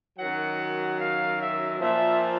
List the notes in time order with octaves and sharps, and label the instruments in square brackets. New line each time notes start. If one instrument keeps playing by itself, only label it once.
[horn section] F#2 D#3 F#3 F#5
F5
E5
A#2 F3 E5